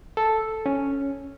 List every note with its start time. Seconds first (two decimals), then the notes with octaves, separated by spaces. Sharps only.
0.17 A4
0.66 C#4